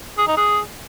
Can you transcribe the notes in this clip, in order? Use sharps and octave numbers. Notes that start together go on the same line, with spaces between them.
G#4
D#4
G#4